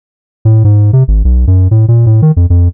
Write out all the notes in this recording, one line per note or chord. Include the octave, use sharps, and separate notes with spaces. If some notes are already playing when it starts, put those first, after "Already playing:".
A2
G#2
C3
G#1
B1
F#2
A2
A#2
A2
D#3
F2
F2